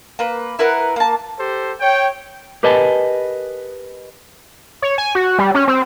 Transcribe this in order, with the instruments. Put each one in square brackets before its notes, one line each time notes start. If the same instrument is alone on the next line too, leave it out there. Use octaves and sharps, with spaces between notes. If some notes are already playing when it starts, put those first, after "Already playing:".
[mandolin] A#3 B4
E4 A#4 B4 F#5
A#3 A5
[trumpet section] G4 A4 C5
C#5 G5
[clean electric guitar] G4 A#4 B4 D#5 G#5 A5
[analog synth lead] C#5
G#5
F#4
G3
C#4
C4